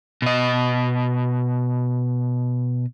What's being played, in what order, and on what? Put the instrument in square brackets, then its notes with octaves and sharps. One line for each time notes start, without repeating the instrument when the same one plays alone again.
[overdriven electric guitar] B2 D#5